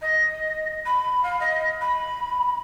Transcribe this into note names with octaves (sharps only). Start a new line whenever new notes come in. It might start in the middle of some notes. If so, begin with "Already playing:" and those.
D#5
B5
F5
D#5
B5